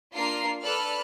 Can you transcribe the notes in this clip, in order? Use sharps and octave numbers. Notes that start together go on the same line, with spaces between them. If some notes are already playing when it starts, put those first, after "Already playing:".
A#3 D4 F4 A#4 C7
A4 B4 D5 B5 F6 F#6